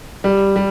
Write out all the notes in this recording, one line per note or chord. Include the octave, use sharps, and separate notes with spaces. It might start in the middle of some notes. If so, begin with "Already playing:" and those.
G3
G3